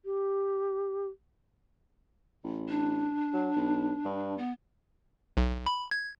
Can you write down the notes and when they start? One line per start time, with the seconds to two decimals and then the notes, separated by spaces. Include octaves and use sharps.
0.05 G4
2.44 A1
2.69 D4
3.33 F#3
3.57 B1
4.05 G2
4.38 B3
5.37 B1
5.66 B5
5.91 G#6